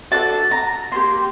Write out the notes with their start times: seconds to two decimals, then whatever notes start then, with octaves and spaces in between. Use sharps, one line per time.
0.11 D4 F#4 A4 A5
0.51 A#5
0.91 A#3 D4 G4 C6